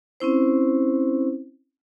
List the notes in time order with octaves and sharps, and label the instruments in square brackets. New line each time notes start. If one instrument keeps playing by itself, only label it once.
[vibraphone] C4 C#4 E4 C5